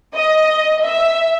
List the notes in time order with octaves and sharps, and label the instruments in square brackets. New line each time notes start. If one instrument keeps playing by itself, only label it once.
[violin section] D#5
E5